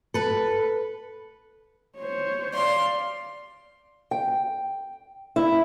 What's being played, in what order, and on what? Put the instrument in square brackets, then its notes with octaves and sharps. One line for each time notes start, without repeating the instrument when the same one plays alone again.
[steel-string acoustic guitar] A4 B4
[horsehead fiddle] C5 C#5
[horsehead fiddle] D5 F5 [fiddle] C6
[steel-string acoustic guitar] G5
E4